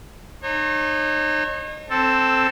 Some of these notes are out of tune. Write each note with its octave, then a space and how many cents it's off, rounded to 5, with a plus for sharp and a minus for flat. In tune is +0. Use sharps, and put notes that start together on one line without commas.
D#4 -30 C#5 -40
C4 +0 A4 +0